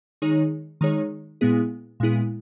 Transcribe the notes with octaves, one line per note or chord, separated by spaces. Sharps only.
D#3 G#3 D#4 G#4 C#5
D#3 G#3 D#4 G#4 C#5
A#2 G#3 B3 E4 G#4
A#2 G#3 B3 E4 G#4